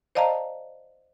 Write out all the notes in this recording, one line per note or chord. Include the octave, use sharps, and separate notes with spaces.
C5 D5 D#5 F5 A5 A#5